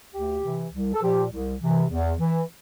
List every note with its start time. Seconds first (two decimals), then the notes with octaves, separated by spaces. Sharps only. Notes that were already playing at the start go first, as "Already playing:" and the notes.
0.14 D2 G4
0.44 C3 E3
0.73 C2
0.94 A4
1.03 A#2 F3 G4
1.31 C2
1.62 C3 E3
1.90 E2
2.20 E3